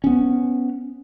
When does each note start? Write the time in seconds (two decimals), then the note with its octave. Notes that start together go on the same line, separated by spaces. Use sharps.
0.04 B3 C#4